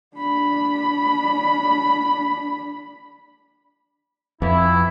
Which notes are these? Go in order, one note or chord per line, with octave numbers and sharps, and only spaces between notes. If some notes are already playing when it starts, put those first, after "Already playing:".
D4 B5
F2 E3 E4